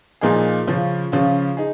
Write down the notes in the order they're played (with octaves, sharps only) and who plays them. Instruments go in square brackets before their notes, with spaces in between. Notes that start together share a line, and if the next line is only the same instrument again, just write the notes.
[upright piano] A#2 F3 A#3 D#4 G#4
C#3 F3 C#4 F4
C#3 F3 C#4 F4
D#4 G#4